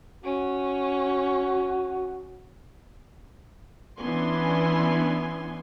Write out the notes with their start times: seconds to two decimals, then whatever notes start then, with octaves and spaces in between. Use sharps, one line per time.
0.24 C#4 F#4
3.99 E3 B3 C#4 D4 G#5 C6